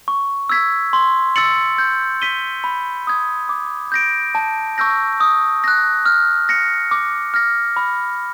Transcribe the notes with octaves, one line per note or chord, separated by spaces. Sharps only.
C#6
E6 G#6 B6
C6
E6 A6 C#7 F#7
G6
B6 D#7 G7
B5
D#6 G#6
D6
G6 A#6 D7
A5
C#6 E6 G6 A#6
D#6
F#6 A#6
F6
A#6 C#7
D6
F6 A#6
B5